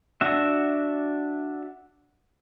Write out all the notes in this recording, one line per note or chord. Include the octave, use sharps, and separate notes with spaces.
D4 F#4 E5